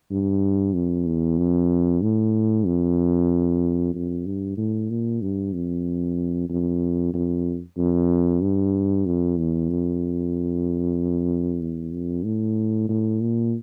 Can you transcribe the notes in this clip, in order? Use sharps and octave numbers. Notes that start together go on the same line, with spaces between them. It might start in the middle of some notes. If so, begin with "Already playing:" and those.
G2
F2
E2
F2
A2
F2
F2
G2
A2
A#2
G2
F2
F2
F2
F2
G2
F2
E2
F2
E2
F2
A2
A2
A#2